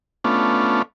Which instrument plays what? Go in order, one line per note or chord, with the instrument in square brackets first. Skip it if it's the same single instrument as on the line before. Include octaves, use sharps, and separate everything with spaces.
[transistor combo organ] A3 B3 C#4 D4 F4